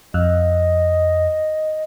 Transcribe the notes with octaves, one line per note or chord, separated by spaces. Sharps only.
F2 D#5